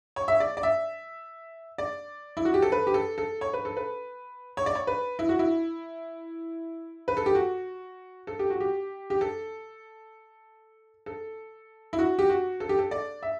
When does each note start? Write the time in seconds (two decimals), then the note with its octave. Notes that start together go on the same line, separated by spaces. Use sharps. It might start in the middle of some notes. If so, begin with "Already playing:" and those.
0.16 C#5
0.28 E5
0.40 D5
0.57 D5
0.63 E5
1.78 D5
2.37 E4
2.45 F#4
2.54 G4
2.62 A4
2.72 B4
2.87 G4
2.94 A4
3.18 A4
3.41 C#5
3.53 B4
3.65 A4
3.77 B4
4.57 C#5
4.66 D5
4.75 C#5
4.87 B4
5.19 E4
5.29 F#4
5.39 E4
7.08 B4
7.17 A4
7.26 G4
7.35 F#4
8.27 A4
8.39 G4
8.50 F#4
8.60 G4
9.10 G4
9.21 A4
11.06 A4
11.93 E4
11.99 F#4
12.19 G4
12.30 F#4
12.60 A4
12.69 G4
12.79 A4
12.91 D5
13.23 E5